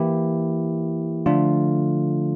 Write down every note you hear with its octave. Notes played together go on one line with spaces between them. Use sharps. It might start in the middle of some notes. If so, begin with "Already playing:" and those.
Already playing: E3 A#3 E4 G4
D3 F3 A3 D4 F4